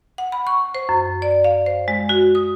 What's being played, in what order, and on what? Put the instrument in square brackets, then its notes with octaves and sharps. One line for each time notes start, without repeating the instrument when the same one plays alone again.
[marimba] F#5
B5
C#6
C5
F#2
D5
F5
C5
G#3
F#4
D#6